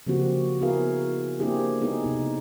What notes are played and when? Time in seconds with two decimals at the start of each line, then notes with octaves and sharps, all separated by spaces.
0.07 C#3 F3 A#3 C4 F#4 G4
0.61 B3 E4 F#4 G#4 A#4 F5
1.40 A#3 C4 D4 E4 G4 G#4
1.81 G#3 B3 D#4 G#4 A4
2.03 C3 D#4 A4